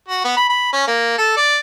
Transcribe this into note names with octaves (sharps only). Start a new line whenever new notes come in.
F#4
B3
B5
B5
C#4
A#3
A4
D5